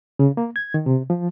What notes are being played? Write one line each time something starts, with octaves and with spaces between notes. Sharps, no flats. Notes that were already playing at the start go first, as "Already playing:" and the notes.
C#3
A#3
G#6
D#3
C3
F3